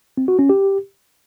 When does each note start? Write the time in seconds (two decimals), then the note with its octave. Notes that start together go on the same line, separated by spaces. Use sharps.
0.17 C4
0.28 F#4
0.39 C#4
0.49 G4